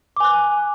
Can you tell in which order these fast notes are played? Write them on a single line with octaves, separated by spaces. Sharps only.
D6 G#5 F#6